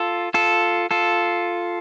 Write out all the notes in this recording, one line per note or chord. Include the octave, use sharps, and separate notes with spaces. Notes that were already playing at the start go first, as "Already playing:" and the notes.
Already playing: F4 A4
F4 A4
F4 A4